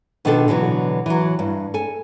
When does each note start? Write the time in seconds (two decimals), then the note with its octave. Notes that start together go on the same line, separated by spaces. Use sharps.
0.25 B2 D#3 F3 D4 G4 A4
0.48 B2 D3 E3 F#3
1.06 E3 F#3
1.39 G2
1.74 A4 G#5